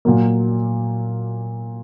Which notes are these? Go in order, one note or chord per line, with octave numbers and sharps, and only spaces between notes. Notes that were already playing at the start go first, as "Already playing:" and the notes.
A#2 F#3 A#3